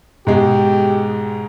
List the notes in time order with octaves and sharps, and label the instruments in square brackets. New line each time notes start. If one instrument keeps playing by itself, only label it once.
[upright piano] G#2 B2 G#3 [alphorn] G4